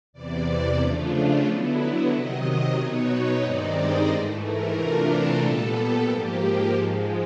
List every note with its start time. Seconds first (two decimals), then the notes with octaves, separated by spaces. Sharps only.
0.13 E2 C3 E3 D5
0.79 C#3 F3 A3 D4 F4
1.45 D3 F#3 B3 E4
2.10 C3 D#3 F#3 D#5
2.76 B2 F#3 B3 D#4 C#5
3.42 G2 D#3 G#3 C4 D#4 D5
3.75 D#5
4.08 G#2 E3 A3
4.41 A#4
4.74 C3 E3 A3 D4 F4
5.07 A4
5.40 A#2 G3 B3
6.05 G#2 F3 A#3 G4
6.71 G#2 F3 G#3